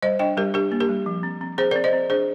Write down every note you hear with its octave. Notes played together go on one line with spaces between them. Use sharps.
G3 C5 D#5
D4 D#5 G5
G3 G4 A#4
D4 G4 A#4
A#3
G4 A#4
G3
F3
C4
C4
C4 G#4 C5
A#4 D5
C4
C5 D#5
C4
D4 G#4 C5